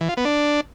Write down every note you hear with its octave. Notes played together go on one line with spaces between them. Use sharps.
E3
F4
B3
D4